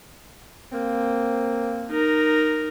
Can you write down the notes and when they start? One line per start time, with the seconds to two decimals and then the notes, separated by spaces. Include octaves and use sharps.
0.72 A#3 C4
1.89 D#4 A#4